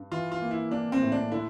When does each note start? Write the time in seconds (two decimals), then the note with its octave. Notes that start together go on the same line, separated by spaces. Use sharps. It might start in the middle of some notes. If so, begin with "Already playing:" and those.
Already playing: G2
0.12 E3 F4
0.32 F4
0.42 A#3
0.51 E4
0.71 A#3 D4
0.92 C4
1.02 A2
1.12 D4
1.32 D3 E4